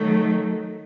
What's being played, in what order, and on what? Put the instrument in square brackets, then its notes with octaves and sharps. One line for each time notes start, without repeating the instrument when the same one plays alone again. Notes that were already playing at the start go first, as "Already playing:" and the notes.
Already playing: [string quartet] D#3 F#3 A3